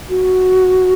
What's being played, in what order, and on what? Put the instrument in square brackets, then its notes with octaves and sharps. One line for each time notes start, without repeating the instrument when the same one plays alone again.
[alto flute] F#4